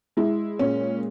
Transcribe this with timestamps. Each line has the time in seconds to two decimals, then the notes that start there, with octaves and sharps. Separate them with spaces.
0.17 G#3 E4
0.59 A#2 C#4